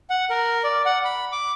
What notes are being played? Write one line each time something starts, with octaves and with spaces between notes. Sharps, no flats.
F#5
A#4
D5
F#5
B5
D6